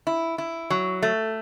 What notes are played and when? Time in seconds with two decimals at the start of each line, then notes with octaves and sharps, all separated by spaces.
0.07 E4
0.38 E4
0.70 F#3
1.03 A3